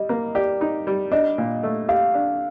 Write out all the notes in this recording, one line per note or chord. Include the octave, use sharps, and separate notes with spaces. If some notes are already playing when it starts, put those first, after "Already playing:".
Already playing: G3 D#5
A#3
G4 D5
D#4
G3
D4 D#5
A#2
A3
G4 F5
D4